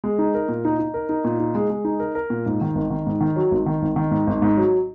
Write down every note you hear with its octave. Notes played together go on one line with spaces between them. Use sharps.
G#3
D#4
A#4
A#2
D#4
D#4
A#4
D#4
A#2
D#4
G#3
G#3
D#4
A#4
A#4
A#2
G#2
D#3
G#1
D#3
G#2
D#3
F#3
G#1
D#3
G#1
D#3
G#2
G#1
G#2
F#3